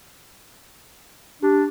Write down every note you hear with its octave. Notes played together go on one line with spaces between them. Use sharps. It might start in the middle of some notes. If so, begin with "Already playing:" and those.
D4 G4